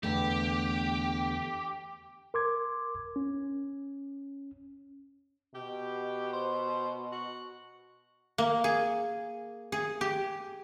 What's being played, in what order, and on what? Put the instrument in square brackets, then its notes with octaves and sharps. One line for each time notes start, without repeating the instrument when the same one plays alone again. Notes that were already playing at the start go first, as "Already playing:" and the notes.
[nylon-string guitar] E2 D3 A3 [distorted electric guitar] G4
[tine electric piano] A#4 C6 D6 G#6
C#4
[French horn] B2 [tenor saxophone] G4
[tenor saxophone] C5
F#4
[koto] A#3
G#4
G#4
G4